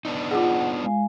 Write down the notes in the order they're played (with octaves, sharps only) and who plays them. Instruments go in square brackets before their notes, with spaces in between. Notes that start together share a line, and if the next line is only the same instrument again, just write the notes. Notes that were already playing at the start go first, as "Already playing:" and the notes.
[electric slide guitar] B3 D4 D#4
[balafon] F4 G#4 [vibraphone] F#5
[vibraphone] G#3 F5 G#5